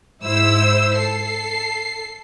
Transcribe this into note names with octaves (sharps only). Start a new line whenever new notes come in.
G#2 E4 C5 E6
A4 C7